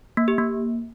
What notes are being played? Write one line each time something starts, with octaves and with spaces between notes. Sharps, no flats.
A#3
G4
A#3